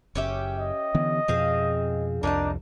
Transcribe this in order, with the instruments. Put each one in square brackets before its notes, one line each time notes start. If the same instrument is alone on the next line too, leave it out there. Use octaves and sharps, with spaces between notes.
[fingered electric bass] F#1 [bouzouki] C#4 G4 E5
[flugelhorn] D#5
[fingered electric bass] D3 E3 B3
[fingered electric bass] F2 B2 F3 [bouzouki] C4 G#4 F5
[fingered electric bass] C2 F2 [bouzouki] A#3 D#4 A5 [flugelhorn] D4